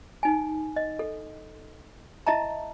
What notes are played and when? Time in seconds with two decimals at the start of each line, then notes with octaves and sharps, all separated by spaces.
0.23 D#4 G#5
0.76 D#5
0.99 A4
2.27 E4 D#5 E5 A5 A#5